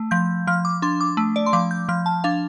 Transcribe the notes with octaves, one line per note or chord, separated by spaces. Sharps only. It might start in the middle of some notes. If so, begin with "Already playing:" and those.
Already playing: A3
F3 G6
F3 F6
D6
D4 C6
D6
A3
D5
C6
F3 D6
G6
F3 F6
A5
D4 F5